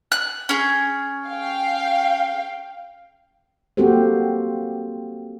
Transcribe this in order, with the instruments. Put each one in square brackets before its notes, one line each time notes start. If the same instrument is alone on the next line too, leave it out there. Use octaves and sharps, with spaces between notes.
[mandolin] F#6
C#4 G#4
[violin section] F5 G5
[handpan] A#3 C4 F#4 G4 A4 C5